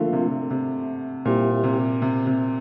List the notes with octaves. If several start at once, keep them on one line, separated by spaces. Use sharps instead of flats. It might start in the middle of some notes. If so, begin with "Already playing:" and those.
Already playing: D3 F3 A3 A#3 F4
C3
C3
C3
A#2 G3 C4 E4 G4
C3
C3
C3